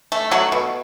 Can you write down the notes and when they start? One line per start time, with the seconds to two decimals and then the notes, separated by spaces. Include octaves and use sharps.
0.12 A3
0.31 F#3 A3 F#4
0.52 B2